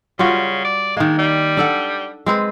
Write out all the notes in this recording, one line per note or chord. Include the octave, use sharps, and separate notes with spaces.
C#3 G3 F4 F#4
D5
D#3 G#3 A#3
G3
D4 A4 F#5
G#3 C4 B4